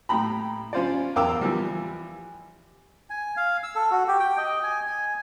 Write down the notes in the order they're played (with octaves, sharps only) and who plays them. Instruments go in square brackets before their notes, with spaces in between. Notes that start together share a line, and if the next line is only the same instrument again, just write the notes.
[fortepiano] A2 G5 A#5 B5
C#4 F4 C5 D5
E2 A#4 F5 G5 D6 E6
E3 F3 G3
[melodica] G#5
F5
E6
A4
F#4
G4
G5
D#5
G#5
G#5